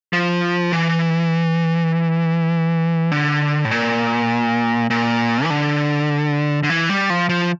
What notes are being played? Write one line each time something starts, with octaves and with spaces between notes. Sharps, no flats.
F3
E3
D3
A2
A#2
A#2
E3
D3
D3
E3
G3
F3
F3